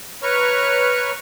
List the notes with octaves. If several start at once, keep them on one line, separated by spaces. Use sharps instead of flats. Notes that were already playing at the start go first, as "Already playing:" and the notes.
B4 C#5 A#5 C#6 F6